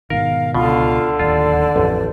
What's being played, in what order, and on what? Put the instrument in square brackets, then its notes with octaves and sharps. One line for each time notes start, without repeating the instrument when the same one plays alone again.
[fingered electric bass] G#2 B2 D#3 [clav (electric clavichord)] A#4 [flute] F5
[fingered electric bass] C#2 [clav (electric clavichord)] B2 [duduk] D3 [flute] F4
[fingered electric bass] D1 D#2 [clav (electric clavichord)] F4 [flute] D5
[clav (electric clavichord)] A1 [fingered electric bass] F2